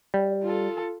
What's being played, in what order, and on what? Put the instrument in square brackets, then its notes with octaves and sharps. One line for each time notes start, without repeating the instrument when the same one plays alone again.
[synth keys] G3
[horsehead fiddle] F4 A4